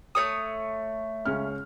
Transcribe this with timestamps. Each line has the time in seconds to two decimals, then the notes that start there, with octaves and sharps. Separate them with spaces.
0.15 A3 C#5 D#6
1.25 C#2 C#4 F6